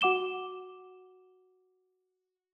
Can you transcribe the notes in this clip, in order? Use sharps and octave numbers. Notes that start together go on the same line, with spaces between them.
F#4 F#5 D6 E7 G7